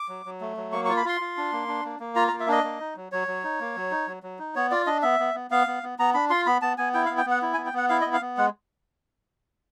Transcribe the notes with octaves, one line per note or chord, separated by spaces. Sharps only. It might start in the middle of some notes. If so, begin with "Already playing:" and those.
Already playing: D6
F#3
F#3
A3
F#3
A#3 C#6
C#6
F4
B5
F4 C6
F4
D4
A#3
D4
A#3
A#3
F4 A#5
A#5
A#3
E5
D4 D#5
A#3
D#4
F#3
F#3 C#5
F#3
D#4
A#3
F#3
D#4
F#3
F#3
D#4
B3 C#5
F4 D5
D4 D#5
B3 E5
B3
B3
B3 F5
B3
B3
B3 A#5
D4 B5
F4 C6
B3 B5
B3 A5
B3 G#5
E4 G5
F5
B3
G5
B3 F#5
E4
G#5
B3
G5
B3 F#5
E4 F5
D#5
B3
F5
B3
G#3 F#5